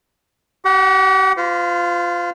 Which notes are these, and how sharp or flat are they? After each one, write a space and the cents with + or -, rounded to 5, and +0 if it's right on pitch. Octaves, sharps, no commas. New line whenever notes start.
G4 -40 F#5 +0
F4 +0 C5 -40